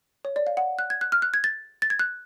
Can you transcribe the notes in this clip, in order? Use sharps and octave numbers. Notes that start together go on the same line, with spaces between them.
C#5
D5
F5
F#5
F#6
G#6
F#6
F6
F#6
G#6
A6
A6
G#6
F#6